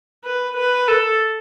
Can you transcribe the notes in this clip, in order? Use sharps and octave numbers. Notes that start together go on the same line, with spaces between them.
B4
B4
A4